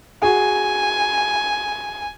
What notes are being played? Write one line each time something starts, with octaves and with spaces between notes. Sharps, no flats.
F#4 G#4 G#5